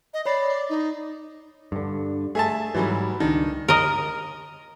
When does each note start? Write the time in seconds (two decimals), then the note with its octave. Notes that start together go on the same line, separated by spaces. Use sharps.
0.14 D#5
0.26 C#5 D5 B5 C7
0.50 D6
0.69 D#4
1.72 G2 D3
2.35 A3 G#4 E5 A5
2.75 G#2 E3 F#3 G3
3.20 C#2 D#3 D4
3.68 A#4 D#5